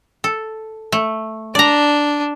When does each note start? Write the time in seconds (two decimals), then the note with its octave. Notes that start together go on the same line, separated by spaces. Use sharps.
0.24 A4
0.92 A3
1.55 D4 D5 A#5